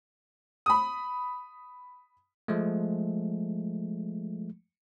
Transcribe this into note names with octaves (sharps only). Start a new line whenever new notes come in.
B5 D#6
F3 G#3 A3